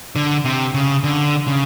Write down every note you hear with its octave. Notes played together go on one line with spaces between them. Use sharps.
D3
C3
C#3
D3
C#3